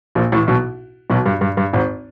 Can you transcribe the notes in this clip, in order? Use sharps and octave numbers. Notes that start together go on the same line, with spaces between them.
A#1 A#2
A1 A2
B1 B2
B1 B2
G2
G2
G2
G#1 G#2